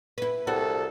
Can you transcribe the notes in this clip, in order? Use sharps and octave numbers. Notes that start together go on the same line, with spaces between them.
E4 B4
C2 F#4 A4